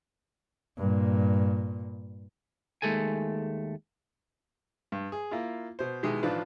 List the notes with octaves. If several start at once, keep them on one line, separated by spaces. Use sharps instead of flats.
G2 A#2
D#2 G#3 A3 A4 G#5
G2
G#4
A#3 E4 F4
B2 C5
B2 D#3 G#3 D#4 E4 G4
A1 D#3 F3 D4 F4 B4